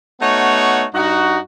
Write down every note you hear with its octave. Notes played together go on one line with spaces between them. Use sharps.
A3 B3 D#4 F#4 C#5
G2 D#4 F#4